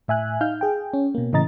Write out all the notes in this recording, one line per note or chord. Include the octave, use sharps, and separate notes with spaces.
A2 E5 G#5 F#6
D#4 F5 F6 G6
G#4 G5
C#4
B2 A#3
A2 C#3 E3 D#5 A#5 A6